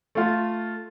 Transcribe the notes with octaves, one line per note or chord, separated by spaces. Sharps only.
A3 F4